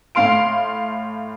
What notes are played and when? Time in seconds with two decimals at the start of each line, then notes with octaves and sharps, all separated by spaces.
0.15 A2 F5 C6 D7